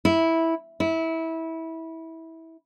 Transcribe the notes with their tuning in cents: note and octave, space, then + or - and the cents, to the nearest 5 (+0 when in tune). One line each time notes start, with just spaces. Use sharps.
E4 -10
E4 -20